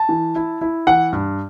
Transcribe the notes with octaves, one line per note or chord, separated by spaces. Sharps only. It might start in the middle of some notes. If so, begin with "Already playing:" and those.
Already playing: A5
E3
E4
E4
E3 F#5
G2